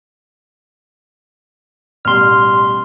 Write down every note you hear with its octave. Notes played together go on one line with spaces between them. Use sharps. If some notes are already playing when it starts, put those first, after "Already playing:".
A1 B2 G3 C6 F6